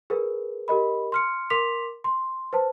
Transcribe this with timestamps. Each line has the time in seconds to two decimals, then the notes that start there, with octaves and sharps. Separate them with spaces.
0.10 G#4 A#4 B4
0.68 G4 A#4 D#5 B5
1.12 C6 F6 C#7
1.50 A#4 C6 D6 B6 F7
2.04 C6
2.53 B4 C5 A5